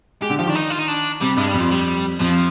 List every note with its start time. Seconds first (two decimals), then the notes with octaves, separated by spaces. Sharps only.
0.22 G#3 G4
0.30 D3
0.39 F3 G4
0.46 D#3 D4
0.55 D#4
0.70 F4
0.79 D#4
0.88 D4
1.21 C3 G3
1.37 G2 G#3
1.48 G3
1.54 F2
1.60 F3
1.71 G3
2.19 F2 F3